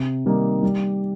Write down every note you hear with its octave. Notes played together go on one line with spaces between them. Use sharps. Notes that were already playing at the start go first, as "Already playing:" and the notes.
Already playing: C3
D#3 G3 A#3 D#4
G3